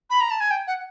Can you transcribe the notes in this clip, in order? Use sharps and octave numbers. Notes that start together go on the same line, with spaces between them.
B5
A#5
A5
G#5
G5
F#5